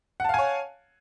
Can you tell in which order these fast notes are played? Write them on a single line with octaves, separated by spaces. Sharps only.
F#5 A5 F5 G#5 C#5